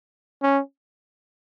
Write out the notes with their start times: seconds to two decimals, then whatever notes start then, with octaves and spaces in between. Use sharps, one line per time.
0.42 C#4